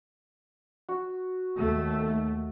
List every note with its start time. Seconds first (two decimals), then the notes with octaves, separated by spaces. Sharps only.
0.88 F#4
1.57 D#2 A3